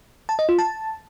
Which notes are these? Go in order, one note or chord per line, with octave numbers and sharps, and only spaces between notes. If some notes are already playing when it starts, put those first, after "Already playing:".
A5
D#5
F4
A5